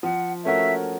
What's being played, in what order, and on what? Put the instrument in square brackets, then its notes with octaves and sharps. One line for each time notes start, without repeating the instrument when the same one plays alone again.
[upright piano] F3 [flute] F#5
[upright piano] A3 C#4 F#4 A#4 [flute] E5